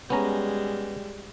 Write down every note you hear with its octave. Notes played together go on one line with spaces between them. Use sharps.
G3 G#3 B3 C#4 A#5